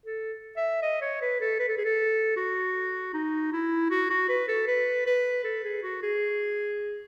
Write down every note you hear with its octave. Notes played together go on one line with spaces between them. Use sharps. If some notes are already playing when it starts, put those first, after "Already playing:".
A4
E5
D#5
C#5
B4
A4
B4
A4
G#4
A4
F#4
D#4
E4
F#4
F#4
B4
A4
B4
B4
A4
G#4
F#4
G#4